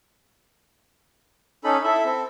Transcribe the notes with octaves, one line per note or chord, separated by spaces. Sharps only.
C#4 D#4 A4 B5
E4 A4 E5
C4 A4